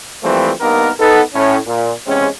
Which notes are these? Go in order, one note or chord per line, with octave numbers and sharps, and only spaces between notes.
E3 F3 G3 A3 A#3 C4
G2 A#3 B3 D#4 A#4
B3 D#4 A4
A2 C#4
A#2
E2 C3 G#3 C4 C#4